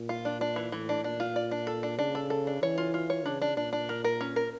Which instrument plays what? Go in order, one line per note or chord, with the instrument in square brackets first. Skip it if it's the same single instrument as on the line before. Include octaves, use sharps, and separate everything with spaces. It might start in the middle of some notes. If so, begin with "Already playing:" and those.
Already playing: [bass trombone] A#2
[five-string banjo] F4
D4
D4
E3
[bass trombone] A2 [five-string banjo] E3
[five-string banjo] D4
[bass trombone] A#2 [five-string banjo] D4
[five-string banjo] F4
D5
D4
A4
D4
[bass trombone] C#3 [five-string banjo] D4
[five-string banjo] A4
A4
D4
[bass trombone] E3 [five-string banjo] C#5
[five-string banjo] F4
F4
C#5
[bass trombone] C#3 [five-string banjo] D4
[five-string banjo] D4
[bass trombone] A#2 [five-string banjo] D4
[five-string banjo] D4
A#4
A#4
C#4
A#4